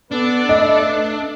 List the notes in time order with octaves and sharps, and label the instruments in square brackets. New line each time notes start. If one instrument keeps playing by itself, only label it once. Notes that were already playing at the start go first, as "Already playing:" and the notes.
[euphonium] B3 [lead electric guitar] D4 [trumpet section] A4 B4 D5
[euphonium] A3 [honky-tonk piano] D#5